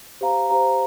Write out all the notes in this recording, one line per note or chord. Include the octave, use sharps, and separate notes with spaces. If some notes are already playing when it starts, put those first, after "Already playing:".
G4 C5 F5 A#5
G4 C5 F5 A#5